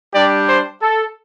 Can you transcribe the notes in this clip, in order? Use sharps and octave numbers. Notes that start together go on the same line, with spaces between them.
G3 D4 G4 D5
C5
A4